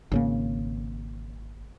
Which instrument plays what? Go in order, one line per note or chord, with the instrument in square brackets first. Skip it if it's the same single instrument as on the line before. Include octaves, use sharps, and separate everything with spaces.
[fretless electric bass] G#1 C#3 A#3